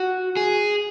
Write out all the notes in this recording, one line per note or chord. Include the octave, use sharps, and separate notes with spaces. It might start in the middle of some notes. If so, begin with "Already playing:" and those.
Already playing: F#4
G#4